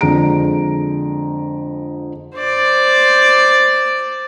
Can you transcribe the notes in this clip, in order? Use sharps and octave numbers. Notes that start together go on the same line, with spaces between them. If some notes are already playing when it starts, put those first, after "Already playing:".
F2 D3 G#3 A#5 D7
C5 D5